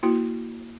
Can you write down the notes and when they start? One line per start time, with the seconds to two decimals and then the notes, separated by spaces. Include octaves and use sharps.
0.03 A#3 E4 F#4